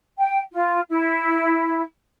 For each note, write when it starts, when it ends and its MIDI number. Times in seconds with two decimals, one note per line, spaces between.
0.17 0.38 79
0.52 0.80 65
0.89 1.82 64